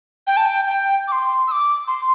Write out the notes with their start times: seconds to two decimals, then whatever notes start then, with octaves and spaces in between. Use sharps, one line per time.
0.27 G5
0.37 A5
0.46 G5
0.67 G5
1.08 D6
1.12 C6
1.48 E6
1.52 D6
1.87 C6